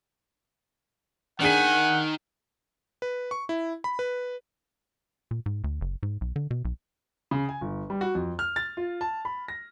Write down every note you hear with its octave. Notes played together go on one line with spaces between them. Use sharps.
D#3 D4 G#4 F#5 G#5 B6
B4
C#6
E4
B5
B4
A#2
G#2
D2
F#1
G#2
B1
D3
B2
B1
C#3
G#5
G1
G3
F#4
F2
F6
A6
F4
A5
B5
A#6